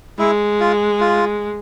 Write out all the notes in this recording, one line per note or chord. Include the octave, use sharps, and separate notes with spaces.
G#3 E4
F4
F4